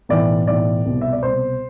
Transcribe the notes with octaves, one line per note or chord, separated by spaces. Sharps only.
B1 A2 E3 D5
B1 A2 E3 D5
C2 B2
E5
D5
C2 B2 C5